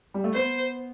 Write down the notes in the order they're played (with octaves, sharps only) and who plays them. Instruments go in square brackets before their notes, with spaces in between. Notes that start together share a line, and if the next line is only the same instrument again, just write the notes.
[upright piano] G3
A3
[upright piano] B3 [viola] C5